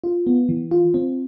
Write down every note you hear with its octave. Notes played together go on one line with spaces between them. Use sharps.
F4
B3
E3
F4
C4